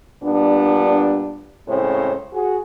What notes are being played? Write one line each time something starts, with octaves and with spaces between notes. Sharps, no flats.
A#2 G3 B3 D4
A2 C#3 G#3 C4 C5 C#5
F#4 G#4